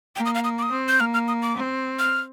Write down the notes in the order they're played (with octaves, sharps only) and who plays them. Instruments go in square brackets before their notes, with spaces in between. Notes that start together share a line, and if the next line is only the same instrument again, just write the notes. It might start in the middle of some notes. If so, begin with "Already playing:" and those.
[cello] A#3 [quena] G5
[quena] D#6
F5
D#6
D6
D#6
[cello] C4
[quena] G6
[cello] A#3 [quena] F6
[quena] F6
D#6
D6
[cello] C4
[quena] F6